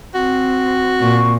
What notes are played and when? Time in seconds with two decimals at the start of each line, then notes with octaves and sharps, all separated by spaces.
0.15 C4 F#4
1.00 A#2 C#6